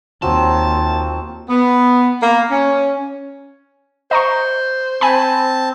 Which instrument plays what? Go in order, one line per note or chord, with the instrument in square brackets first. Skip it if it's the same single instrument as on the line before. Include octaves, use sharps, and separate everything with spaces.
[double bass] D#2 [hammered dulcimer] F3 F#3 C4 [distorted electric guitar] A5
[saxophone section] B3
A#3
C#4
[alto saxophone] C5 [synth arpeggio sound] D#5 A#5 C#6
[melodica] C4 [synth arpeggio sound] G#5 B5 [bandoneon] A5